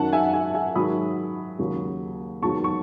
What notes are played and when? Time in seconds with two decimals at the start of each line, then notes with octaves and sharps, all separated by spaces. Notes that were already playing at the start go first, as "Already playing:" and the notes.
Already playing: F#2 D#3 F#3 F#5 A5
0.13 E5 G#5
0.34 E5 G#5
0.55 E5 G#5
0.76 G#2 D#3 F#3 B5 D#6
1.59 D#2 C#3 F#3
2.42 E2 D#3 F#3 A5 C#6
2.64 C#6